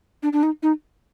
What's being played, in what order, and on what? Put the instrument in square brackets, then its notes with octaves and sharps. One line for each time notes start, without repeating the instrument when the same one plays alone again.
[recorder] D4
D4
D#4
D#4